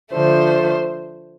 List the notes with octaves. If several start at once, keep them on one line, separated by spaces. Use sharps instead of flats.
D3 F3 A3 C5